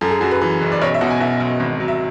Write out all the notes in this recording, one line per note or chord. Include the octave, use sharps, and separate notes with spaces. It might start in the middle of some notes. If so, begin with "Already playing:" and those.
F#2 A4
G#4
F#2 F#4
B4
E3
F#1
D5
B1 C#5
E5
B2 F#5
G#5
B2 E5
B1
G#1
F#3
E5